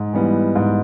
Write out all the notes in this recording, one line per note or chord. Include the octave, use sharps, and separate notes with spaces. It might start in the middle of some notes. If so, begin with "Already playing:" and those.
Already playing: G#2
E3 G3 B3
G#2